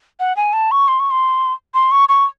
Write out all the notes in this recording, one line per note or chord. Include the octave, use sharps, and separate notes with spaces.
F#5
G#5
A5
C#6
C6
C#6
C6
C6
C#6
C#6